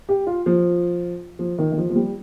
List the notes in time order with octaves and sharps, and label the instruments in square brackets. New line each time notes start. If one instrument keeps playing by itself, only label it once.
[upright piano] G4
F4
F3
F3
D#3
D#3
F3
F3
G3